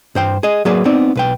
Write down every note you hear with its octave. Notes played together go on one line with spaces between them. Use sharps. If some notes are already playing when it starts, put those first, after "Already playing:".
G2 C5 G5
G#4 D#5
F#3 A#3 G#4 B4 D5
B3 C4 D#4 D5
B1 B4 G5